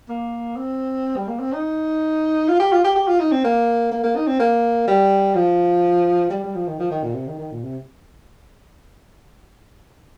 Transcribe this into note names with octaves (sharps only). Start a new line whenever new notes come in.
A#3
C4
G3
A#3
C4
D#4
F4
G4
F4
G4
G4
F4
D#4
C4
A#3
A#3
A#3
D#4
C4
A#3
G3
F3
G3
G3
F3
D#3
F3
D#3
A#2
C3
D#3
D#3
A#2
C3